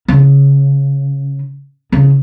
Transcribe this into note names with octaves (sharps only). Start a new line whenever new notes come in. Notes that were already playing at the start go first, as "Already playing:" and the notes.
C#3
C#3